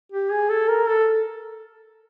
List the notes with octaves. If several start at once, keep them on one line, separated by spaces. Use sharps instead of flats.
G4
G#4
A4
A#4
A4